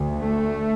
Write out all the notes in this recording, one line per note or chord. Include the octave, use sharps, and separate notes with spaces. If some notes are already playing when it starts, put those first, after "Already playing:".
Already playing: D2
A3